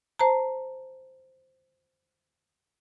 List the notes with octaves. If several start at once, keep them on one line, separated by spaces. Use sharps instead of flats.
C5 A5 A#5